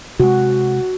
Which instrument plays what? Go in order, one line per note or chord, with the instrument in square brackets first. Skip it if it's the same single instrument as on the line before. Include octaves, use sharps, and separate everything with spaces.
[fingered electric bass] C3 G#3 [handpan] F#4